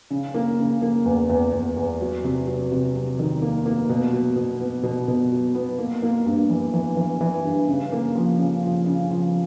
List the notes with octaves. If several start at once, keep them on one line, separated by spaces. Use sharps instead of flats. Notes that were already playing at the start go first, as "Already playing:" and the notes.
C#3
A#3
C#3
A#3
E2
E2
E2
E2
F#3
C3
F#3
C3
F#3
D#3
A#3
A#3
B2
F#3
B2
B3
B2
B2
F#3
B3
A#3
A#3
G2
E3
E3
E3
E3
G2
C#3
A#3
F3
C#3
F3
C#3
F3